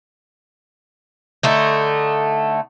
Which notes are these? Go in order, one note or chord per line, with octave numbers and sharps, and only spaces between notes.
D3 A3 D#4